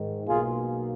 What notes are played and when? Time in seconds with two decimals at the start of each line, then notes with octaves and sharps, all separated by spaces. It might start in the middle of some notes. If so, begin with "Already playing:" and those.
Already playing: G#2 D#3
0.28 B1 B2 A#3 F4 G#4